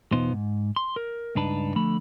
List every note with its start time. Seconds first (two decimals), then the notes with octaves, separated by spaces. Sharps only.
0.12 E2 B2 B3 D#4 F4 C5
0.33 G#2
0.76 C6
0.96 A#4
1.35 C#2 G2 D4 D#4 B4 A5
1.76 D3 F3 A3 B5